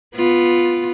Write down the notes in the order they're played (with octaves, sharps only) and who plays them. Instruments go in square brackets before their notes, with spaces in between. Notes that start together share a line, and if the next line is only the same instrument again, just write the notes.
[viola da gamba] B3 F4